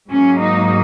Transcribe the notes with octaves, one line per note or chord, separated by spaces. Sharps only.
G#2 F#3 A#3 C#4
D#4